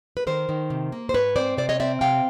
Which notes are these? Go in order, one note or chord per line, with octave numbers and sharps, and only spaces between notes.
B4
D#3 A#4 C5
D#3
C3
A#3
C5
G#2 B4 C#5
C4 C5 D5
C3 C5 D5
C#5 D#5
C4 D5 E5
C3 F5 G5